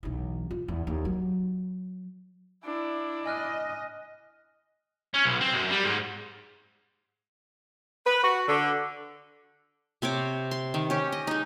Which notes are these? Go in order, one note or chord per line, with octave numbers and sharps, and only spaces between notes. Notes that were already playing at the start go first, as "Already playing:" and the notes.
B1 E3
F4
E2
D#2
F#3
D4 E4
D#5 G#5 F6 F#6
C#4
B1
C4
F#2
G3
G#2
B4
F#4
D3
C3 C4 C#5 D6
C6
D#3
C#4 G4
D#5
G#3 D#4